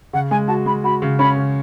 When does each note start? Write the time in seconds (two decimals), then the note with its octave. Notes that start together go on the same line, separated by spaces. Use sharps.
0.13 C#3 F#5
0.31 G#3 G#5
0.48 F#4 A5
0.66 G#3 B5
0.84 F#4 B5
1.02 C#3
1.19 C#4 B5
1.37 C#3